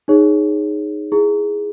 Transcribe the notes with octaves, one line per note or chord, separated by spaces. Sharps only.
D#4 G#4 C#5
E4 G#4